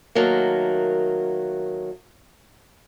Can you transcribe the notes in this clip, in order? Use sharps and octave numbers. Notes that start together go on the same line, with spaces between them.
D#3 F#3 A3 A#3